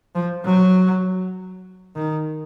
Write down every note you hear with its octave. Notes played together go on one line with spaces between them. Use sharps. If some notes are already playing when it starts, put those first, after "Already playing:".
F3
F#3
D#3